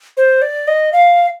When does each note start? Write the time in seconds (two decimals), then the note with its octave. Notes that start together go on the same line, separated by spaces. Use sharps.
0.17 C5
0.42 D5
0.68 D#5
0.93 F5